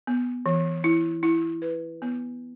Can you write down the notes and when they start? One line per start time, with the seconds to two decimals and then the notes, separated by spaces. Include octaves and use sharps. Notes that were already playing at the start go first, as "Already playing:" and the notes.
0.07 B3
0.46 E3
0.84 E4
1.23 E4
1.62 B4
2.02 B3